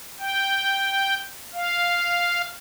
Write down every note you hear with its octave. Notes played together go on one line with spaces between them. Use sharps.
G5
F5